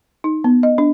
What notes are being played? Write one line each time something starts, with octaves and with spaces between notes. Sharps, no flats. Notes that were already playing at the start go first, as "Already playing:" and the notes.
D#4
B3
D#5
D4